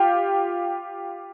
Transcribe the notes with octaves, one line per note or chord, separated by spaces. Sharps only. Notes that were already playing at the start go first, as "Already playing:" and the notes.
Already playing: F4 G4